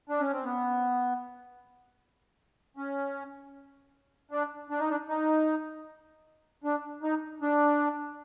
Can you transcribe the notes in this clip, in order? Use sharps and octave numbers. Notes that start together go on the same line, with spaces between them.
D4
C#4
C4
B3
C#4
D4
D4
D#4
D4
D#4
D4
D#4
D4